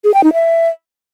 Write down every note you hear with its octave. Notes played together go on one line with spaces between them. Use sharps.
G#4
G5
D#4
E5